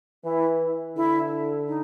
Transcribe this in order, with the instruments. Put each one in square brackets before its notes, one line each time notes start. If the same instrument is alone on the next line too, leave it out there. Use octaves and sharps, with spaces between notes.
[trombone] E3 [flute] E4
[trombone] D3 [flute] E4
[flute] D#4